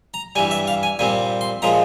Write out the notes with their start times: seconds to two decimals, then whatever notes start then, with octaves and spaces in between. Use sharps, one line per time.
0.14 A#5
0.36 G2 E3 G3 G#5
0.51 E5
0.67 F5
0.83 G#5
0.99 A#2 G3 C4 G#5
1.41 C6
1.62 A#2 F3 G#3 A#5